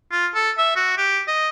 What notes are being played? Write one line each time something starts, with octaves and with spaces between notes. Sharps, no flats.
F4
A4
E5
F#4
G4
D#5